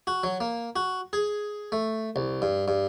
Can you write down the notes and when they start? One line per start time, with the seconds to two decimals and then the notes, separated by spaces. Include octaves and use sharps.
0.07 F#4
0.23 F#3
0.41 A#3
0.76 F#4
1.13 G#4
1.72 A3
2.16 C2
2.42 G2
2.68 G2